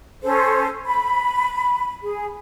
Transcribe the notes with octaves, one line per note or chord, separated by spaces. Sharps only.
C#4 A4 C5
B5
G#4